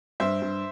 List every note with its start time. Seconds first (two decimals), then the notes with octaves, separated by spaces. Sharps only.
0.20 G2 C5 E5
0.42 G2